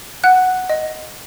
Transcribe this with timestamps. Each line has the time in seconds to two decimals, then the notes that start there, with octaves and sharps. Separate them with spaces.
0.24 F#5 F#6
0.70 D#5